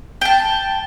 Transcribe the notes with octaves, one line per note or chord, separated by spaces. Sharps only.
G5 A5